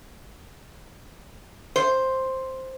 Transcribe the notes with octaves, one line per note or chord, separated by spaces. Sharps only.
C5